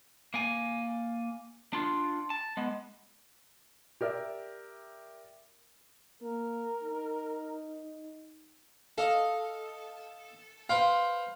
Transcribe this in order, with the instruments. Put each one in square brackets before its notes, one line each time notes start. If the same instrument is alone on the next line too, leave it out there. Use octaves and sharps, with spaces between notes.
[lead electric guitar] A#3 G#5
D4 F4
A5
G#3 B3
[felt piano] G4 A#4 D5 E5
[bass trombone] A#3 [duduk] A#4
[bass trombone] D#4
[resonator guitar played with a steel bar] A4 [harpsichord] D#5 F5
[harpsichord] B4 C5 G5 [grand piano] F5